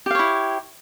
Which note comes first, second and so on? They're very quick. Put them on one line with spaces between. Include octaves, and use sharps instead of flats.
G4 F5 C#5 E4